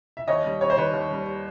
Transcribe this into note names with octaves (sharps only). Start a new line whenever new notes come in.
E5
D#2 C#5 D#5
G3
D#2 C#5
C5
D#3 B4 C#5
D#2
G3